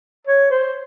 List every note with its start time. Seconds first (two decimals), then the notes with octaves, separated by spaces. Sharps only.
0.27 C#5
0.51 C5